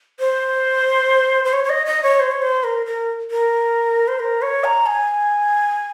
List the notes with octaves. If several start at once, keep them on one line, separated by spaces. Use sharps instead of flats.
C5
C5
C#5
C#5
D#5
D#5
C#5
C5
C#5
C5
A#4
A#4
A#4
C5
A#4
C#5
A#5
G#5